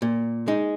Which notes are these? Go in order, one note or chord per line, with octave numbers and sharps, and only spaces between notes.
A#2
G#3 D#4